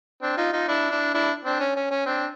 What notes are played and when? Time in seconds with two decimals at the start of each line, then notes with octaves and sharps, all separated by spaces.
0.22 C4 D4
0.37 D#4 F4
0.53 D#4 F4
0.68 D4 E4
0.91 D4 E4
1.14 D4 E4
1.45 C4 D4
1.60 C#4
1.76 C#4
1.91 C#4
2.06 C4 D4